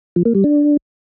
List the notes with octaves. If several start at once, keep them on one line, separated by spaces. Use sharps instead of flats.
F3
A#3
G3
D4